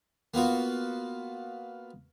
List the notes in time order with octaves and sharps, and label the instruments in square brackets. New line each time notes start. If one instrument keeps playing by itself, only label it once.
[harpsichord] A#3 B3 F4 F#4